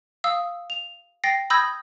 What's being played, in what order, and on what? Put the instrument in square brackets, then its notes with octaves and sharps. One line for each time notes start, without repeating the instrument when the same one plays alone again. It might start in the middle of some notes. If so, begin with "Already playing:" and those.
[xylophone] F5 D#6 E6
F7
G5 A6 A#6 C7
B5 D#6 E6 G6 G#6 A#6